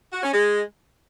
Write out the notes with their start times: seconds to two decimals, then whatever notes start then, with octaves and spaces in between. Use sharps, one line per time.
0.13 F#4
0.23 C#4
0.33 G#3